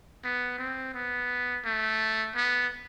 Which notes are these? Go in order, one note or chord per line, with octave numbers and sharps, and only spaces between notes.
B3
C4
B3
A3
B3